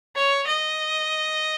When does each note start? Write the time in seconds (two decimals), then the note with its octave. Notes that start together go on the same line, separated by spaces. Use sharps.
0.15 C#5
0.47 D#5